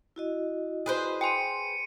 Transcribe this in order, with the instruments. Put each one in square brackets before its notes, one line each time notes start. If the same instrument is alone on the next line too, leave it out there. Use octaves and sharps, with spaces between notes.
[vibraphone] E4 F#4 D#5
[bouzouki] G#4 B4 C5
[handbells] G5 G#5 C6 [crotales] C#7 D#7